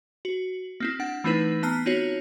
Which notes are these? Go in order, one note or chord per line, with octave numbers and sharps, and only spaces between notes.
F#4
A#3 C4 E4
D4 F#5
E3 A3 C4 D#4 E4 B4
B3 A5 A#5 F6 B6 C7
C4 D#4 F4 F#4 C#5